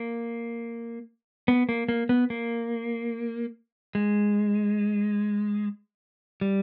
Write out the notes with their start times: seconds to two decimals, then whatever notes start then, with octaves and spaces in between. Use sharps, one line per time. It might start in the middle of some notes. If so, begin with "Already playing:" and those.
Already playing: A#3
1.48 B3
1.69 A#3
1.89 A#3
2.09 B3
2.30 A#3
3.95 G#3
6.41 G3